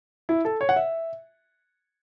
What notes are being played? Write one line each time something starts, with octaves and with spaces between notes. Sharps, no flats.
E4
A4
C#5
F#5
E5